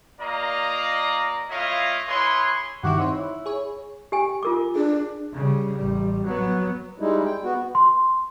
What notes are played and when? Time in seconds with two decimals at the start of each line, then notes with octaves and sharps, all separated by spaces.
0.20 A#3 F4 D5 D#5 A#5
1.50 A3 E4 F4 C#5 D#5 F5
2.08 E4 G#4 B4 C#5 C6
2.83 G2 D#3 E4 F#4 G4 F#5
2.98 C4 D#4 C#5
3.14 E4
3.46 G#4 C#5
4.12 G4 G5 G#5
4.43 F4 A#4 D6
4.76 D4 G#4
5.33 C#3 G3
5.76 A1 G3
6.25 F#3 B3
7.00 G3 G#3 D#4 E4
7.25 G5
7.44 B3 F#4
7.75 C6